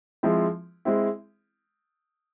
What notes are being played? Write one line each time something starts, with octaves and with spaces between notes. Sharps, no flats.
F3 G#3 C4 E4
G#3 C4 E4